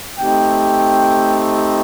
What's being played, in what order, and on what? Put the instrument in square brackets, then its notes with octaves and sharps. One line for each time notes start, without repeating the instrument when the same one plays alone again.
[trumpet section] A3 C4 D#4 G4 G5